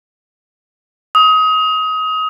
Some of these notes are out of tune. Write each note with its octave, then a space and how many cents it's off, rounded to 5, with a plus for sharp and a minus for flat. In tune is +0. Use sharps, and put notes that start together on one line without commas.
D#6 +25